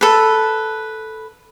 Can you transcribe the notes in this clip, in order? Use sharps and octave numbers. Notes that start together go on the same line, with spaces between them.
A4 B4